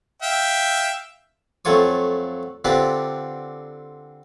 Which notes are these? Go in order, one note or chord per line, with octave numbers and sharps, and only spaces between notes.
E5 F5 G5
F2 F#3 A3 F4 C#5 D#6
D3 C4 D4 F4 G4 B4